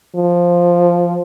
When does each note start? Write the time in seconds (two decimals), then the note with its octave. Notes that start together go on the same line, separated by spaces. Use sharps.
0.16 F3